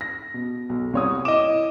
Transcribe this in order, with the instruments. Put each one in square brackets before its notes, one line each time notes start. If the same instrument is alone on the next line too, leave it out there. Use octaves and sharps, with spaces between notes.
[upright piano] A#6
B2
B1
C2 C#5 D#6
[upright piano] E4 E7 [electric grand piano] D#5 D6